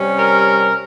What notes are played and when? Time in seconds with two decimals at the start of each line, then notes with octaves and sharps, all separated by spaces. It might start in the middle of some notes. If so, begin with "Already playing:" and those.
Already playing: C3 G3 C#4
0.19 A#4